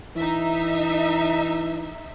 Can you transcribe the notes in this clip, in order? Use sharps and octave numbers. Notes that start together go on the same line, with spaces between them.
E3 D#4 E5